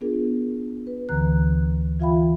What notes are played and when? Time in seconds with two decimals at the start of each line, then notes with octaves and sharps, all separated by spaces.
0.01 B3 D4 F4 G#4 A#4
0.87 B4
1.09 D2 D3 E3 B4 A#5 F#6
2.00 E3 F4 E5 F5 G5 B5